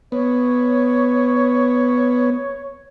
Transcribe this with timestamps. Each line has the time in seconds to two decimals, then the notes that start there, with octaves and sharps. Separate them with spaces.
0.12 B3 C#5